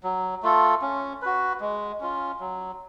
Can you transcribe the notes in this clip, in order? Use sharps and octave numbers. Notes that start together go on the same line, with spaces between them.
F#3
A3 F4 A4
C#4
F#4 B4
G#3
C#4 F4
F#3